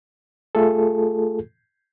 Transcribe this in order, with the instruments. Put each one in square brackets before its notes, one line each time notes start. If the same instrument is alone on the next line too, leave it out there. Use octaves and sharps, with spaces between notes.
[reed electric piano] A3 F4 G#4 A4